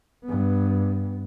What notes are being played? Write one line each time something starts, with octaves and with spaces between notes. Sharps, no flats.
G2 B3